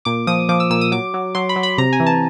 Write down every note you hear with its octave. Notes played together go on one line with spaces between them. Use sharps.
A#2 D6
F3 D#6
F3 D6
E6
A#2 E6
D#6
F#3 D6
F#3
F#3 C6
B5
F#3
B5
C3 A#5
G#5
E3
A5